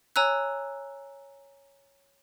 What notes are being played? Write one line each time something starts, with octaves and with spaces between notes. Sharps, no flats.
C#5 G#5 A#5 E6 F#6